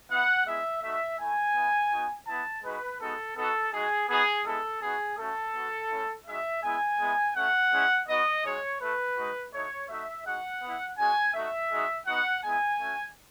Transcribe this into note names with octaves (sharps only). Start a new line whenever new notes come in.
B3 E4 F#5
G#3 B3 E4 E5
A3 D#4 F#4 E5
A3 E4 G#5
B3 E4
B3 D#4 F#4
B3 E4 A5
G#3 D#4 F#4 B4
G#3 B3 D#4 F#4 A4
B3 D#4 F#4 A4
G#3 D#4 F#4 G#4
B3 D#4 F#4 G#4
G#3 B3 E4 A4
B3 D#4 F#4 G#4
A3 C#4 F#4 A4
B3 F#4
A3 C#4 E4
G#3 D#4 F#4 E5
G#3 B3 E4 G#5
G#3 B3 E4
A3 C#4 F#4 F#5
G#3 C#4 E4
B3 D#4 F#4 D#5
G#3 D#4 F#4 C#5
A3 E4 B4
G#3 D#4 F#4
A3 D#4 F#4 C#5
A3 D#4 F#4 E5
G#3 D#4 F#4 F#5
B3 E4
G#3 C#4 F#4 G#5
A3 D#4 F#4 E5
G#3 D#4 F#4
B3 D#4 F#4 F#5
G#3 B3 E4 G#5
A3 C#4 F#4